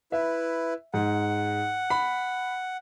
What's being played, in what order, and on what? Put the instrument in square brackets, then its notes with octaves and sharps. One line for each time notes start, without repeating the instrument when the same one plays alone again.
[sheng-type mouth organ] E4 B4 [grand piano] E5
[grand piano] G#2 [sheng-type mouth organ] F#5
[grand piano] B5